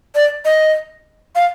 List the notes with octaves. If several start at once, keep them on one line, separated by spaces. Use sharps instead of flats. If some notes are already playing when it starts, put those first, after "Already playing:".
D5
D#5
F5